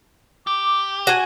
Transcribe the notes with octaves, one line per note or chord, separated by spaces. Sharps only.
G4 D6
F#4 G#5